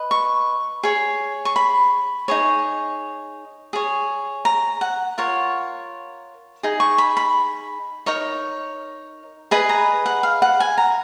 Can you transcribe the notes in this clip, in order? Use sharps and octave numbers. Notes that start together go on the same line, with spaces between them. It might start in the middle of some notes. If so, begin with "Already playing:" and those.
Already playing: B4 D#5
C#6
G#4 C#5
C#6
B5
D#4 G#4 C#5
G#4 C#5
A#5
F#5
F4 A#4 C#5
D#4 G#4
C#6
B5
B5
D#4 A#4 C#5 A#5
G#4 B4 D#5 B5
A#5
F#5
F5
F#5
G#5
A#5